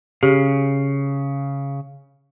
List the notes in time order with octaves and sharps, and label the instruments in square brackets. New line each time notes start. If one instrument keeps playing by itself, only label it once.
[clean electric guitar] C#3 [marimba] G4